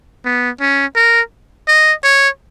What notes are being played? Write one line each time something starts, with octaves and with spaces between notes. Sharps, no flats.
B3
C#4
A#4
D#5
C#5